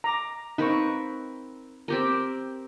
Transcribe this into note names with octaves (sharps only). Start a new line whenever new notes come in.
A#5 D6
C4 D#4 A#4 B4 C#6
C4 G4 A#4